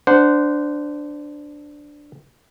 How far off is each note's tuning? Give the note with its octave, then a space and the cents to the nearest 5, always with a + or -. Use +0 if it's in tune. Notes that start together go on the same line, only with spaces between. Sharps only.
D4 +0 C5 -20 F#5 +0